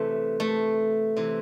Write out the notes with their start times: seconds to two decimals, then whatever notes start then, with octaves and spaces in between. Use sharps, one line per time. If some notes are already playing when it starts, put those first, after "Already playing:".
Already playing: C3 E3 A3
0.40 A3
1.16 C3 E3